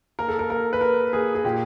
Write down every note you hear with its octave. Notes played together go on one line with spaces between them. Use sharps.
A#3 A#4
A4
A#4
A#3 A#4
B4
A#3 A#4
A#3 G#4
G#4
A#2 G4